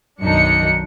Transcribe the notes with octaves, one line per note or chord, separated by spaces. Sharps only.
B1 F#2 D#3 D4 D#4 C#7